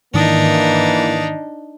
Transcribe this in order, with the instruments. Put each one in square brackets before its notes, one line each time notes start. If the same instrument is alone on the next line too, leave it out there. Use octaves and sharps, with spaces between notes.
[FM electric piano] G#2 D#3 D#6 [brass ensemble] E3 A#3 [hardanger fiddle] D4 D#4